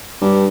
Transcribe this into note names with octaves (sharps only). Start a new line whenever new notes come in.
G2